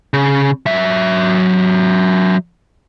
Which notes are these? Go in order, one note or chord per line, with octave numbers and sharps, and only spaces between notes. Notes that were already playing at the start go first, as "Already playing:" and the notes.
C#3
F#3 E5